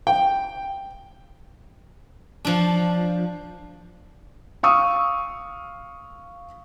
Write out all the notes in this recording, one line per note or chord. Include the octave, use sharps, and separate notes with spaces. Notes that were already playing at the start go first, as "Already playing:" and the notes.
G5
F3 D4
F5 C#6 D#6 E6